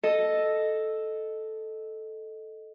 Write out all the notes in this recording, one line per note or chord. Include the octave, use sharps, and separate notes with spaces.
A4 D#5